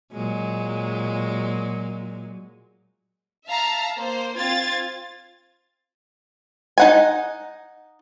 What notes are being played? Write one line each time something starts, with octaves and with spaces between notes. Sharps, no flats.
A#2 F#3 G#3
E5 F5 A5 A#5
A#3 C5
C4 F4 G#6 A6
D#4 F#5 G#5